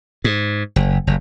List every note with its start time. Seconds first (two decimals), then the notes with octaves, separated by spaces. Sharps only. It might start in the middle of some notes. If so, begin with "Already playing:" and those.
0.24 G#2
0.76 F#1
1.07 F#1